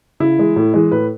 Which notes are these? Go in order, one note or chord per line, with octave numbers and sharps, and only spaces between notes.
C#3 E4
E3 G#3
A2
E3 G#3
A2 B4